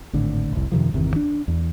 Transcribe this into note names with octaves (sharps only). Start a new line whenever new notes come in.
G#1 A2 D3
F1 C2
F#2 C3 D#3 F3
G1 E2 C3 D#3
D4
E2